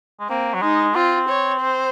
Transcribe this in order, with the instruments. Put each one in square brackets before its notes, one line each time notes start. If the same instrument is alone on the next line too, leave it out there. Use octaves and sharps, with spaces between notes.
[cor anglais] G#3
[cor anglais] A#3 [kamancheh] C4
[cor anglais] F#3
[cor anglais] G#3 [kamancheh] D#4
[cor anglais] C4 [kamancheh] F4
[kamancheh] C#5
C5